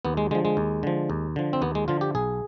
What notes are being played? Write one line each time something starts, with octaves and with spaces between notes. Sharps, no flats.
D#2 B3
G#3
D3 F3 G#3
G#3
D#2
D3 F3
D#2
D3 F3
C4
D#2 B3
G#3
D3 F3 F4
G4
B1 G#4